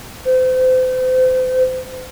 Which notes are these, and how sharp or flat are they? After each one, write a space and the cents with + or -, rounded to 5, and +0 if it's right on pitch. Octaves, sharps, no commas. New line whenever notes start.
C5 -35